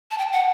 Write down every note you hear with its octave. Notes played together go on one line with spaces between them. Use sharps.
A5
G5
F#5